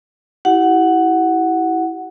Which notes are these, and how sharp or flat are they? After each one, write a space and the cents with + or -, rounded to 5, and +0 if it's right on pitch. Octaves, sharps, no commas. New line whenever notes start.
E4 -10 G4 -30 F#5 +0